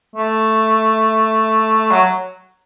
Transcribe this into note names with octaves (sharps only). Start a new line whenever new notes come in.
A3
F#3